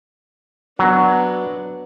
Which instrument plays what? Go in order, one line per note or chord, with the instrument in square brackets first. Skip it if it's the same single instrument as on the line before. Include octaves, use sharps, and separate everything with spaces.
[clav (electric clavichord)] F#3 [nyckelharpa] B3 D4